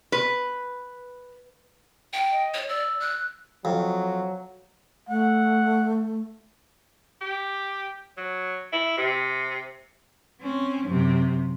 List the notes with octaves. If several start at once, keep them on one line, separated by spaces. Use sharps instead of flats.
B4
G5
D#5
C#5
D5 E6
F#6
F2 F#3
A3 F#5
G4
F#3
E4
C3
C4 C#4
F#2 C3